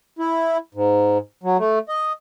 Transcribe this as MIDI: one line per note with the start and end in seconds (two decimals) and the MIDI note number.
0.19 0.58 64
0.75 1.18 44
1.43 1.57 54
1.59 1.79 57
1.89 2.12 75